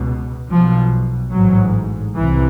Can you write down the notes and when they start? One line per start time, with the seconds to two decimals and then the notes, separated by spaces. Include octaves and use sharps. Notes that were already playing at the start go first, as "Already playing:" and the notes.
Already playing: C#2 B2
0.49 B1 B2 F3
1.32 A1 G#2 F#3
2.16 C2 C3 E3